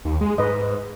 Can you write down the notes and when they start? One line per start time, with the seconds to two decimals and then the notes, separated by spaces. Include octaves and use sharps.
0.05 D#2
0.21 G#3
0.38 G#2 B4 D#5